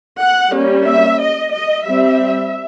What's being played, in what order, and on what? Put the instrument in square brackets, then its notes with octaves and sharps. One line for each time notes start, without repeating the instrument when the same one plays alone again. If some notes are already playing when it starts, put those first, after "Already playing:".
[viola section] F#5
G3 A#3 C#4
E5
D#5
D#5
G3 C4 E5